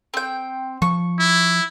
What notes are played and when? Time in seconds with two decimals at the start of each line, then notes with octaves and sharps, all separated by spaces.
0.14 C4 G5
0.82 F3 C#6
1.19 E4